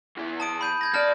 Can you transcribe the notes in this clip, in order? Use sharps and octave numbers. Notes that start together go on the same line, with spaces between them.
E2 E3
A5 D#6 D7
B5 G6 D#7
G6 G#6 A#6
C2 D5 A5 F6 A#6